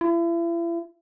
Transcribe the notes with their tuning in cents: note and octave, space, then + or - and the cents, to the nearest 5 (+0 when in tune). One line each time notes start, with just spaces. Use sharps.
E4 +40